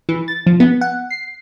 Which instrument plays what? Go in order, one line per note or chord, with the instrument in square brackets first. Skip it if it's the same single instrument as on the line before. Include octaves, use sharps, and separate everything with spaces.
[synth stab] E3
A6
F3
B3
F#5
C7